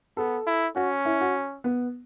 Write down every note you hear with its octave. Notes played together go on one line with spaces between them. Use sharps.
B3 A4
E4
C#4 F#4
E4
F#4
B3